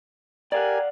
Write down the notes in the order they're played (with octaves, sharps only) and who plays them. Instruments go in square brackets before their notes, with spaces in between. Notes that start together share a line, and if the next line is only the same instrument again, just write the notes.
[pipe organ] G4 A#4 G#5 [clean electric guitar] D5 F5 F#5